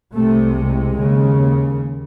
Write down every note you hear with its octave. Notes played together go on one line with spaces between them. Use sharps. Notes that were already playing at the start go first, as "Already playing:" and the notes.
C2 C3 A3
G#3
D#2 C#3